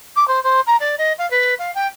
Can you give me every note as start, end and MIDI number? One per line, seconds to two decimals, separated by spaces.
0.16 0.27 86
0.27 0.41 72
0.43 0.60 72
0.66 0.76 82
0.80 0.95 74
0.98 1.12 75
1.18 1.28 77
1.30 1.54 71
1.58 1.73 77
1.74 1.87 79